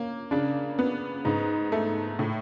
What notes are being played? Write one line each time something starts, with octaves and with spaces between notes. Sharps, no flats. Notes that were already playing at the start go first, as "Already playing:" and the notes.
Already playing: A#3 C#4
C#3 D4
B3
G#2 D#4
A3
A2